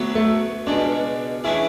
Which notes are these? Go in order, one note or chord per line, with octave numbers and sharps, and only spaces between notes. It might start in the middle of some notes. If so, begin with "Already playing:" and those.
Already playing: D2 D3 F#3 B3
A3
C#2 B2 G#3 D4
C#3 E3 A3 D4 E4 G#4